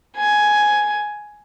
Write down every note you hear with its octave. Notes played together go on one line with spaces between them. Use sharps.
G#5